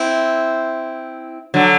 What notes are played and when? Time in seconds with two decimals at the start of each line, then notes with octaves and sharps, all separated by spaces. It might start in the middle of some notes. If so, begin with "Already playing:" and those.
Already playing: C4 E4
1.54 D3 F#3